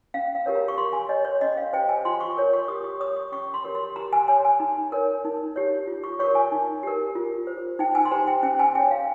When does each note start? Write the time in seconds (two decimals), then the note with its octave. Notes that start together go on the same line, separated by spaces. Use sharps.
0.14 C#4 F5
0.35 F5
0.46 G4 A#4 C#5
0.55 A#5
0.68 C#6
0.78 G4 C6
0.93 G#5
1.09 C#5 D#5
1.25 C#5
1.41 C#4 D#5
1.57 F5
1.73 G4 C5 G5
1.89 G#5
2.05 F4 C6
2.21 C#6
2.37 A#4 C#5
2.53 C#6
2.68 G4 D#6
2.84 C#6
3.00 C#5 D#6
3.17 C#6
3.32 C#4 C#6
3.54 C6
3.64 G4 A#4 C#5
3.75 C6
3.96 G4 A#5
4.13 G#5
4.28 C#5 G#5
4.45 G#5
4.60 D#4 A#5
4.92 A#4 C#5
5.25 D#4
5.56 G4 C#5
5.87 F4
6.04 C#6
6.19 A#4 C#5 C#6
6.35 G#5
6.52 D#4
6.83 G4 A#4
7.15 F4
7.47 C5
7.79 D#4 G5
7.95 G#5
8.05 C6
8.11 G4 C5 A#5
8.27 G5
8.43 C#4 G5
8.59 G#5
8.75 G#4 C#5 G5
8.91 F5